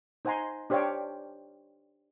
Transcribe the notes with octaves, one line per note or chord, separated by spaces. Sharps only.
D#4 C5 F#5 G#5 A#5 C6
D4 G4 C5 C#5 F5 G5